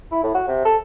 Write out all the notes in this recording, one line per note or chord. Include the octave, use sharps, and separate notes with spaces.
E4
A2
F#4
C3
A4